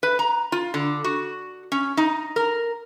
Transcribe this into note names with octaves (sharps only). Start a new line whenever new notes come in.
B4
A#5
F4
D3
F#4
C#4
D#4
A#4